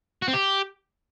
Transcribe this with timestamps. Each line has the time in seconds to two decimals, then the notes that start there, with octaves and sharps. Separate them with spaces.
0.22 F#4
0.28 C4
0.34 G4